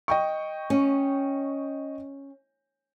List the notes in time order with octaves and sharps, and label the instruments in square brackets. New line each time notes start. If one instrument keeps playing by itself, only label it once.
[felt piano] D#5 G5 C#6
[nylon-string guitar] C#4